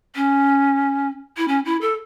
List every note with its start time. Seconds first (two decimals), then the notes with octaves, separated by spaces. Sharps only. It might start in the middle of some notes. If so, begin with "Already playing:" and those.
0.15 C#4
1.37 E4
1.48 C#4
1.65 E4
1.81 A4